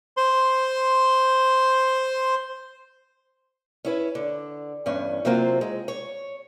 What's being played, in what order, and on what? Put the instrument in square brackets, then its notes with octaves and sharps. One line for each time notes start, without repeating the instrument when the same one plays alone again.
[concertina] C5 C6
[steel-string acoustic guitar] C#4 E4 B4
D3
E2 G2 C#4
C3 F#3 A#3 C4 F4 F#4
G#3
C#5